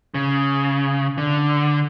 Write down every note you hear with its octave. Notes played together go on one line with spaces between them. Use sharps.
C#3
D3